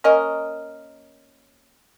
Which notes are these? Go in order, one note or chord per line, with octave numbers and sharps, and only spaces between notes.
A#3 C#4 A#4 D#5